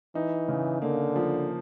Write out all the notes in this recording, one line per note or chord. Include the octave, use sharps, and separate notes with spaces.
E3 D#4
C#3
D3 A#3
F3